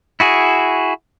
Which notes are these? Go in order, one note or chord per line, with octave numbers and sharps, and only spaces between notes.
E4 F#4 G#4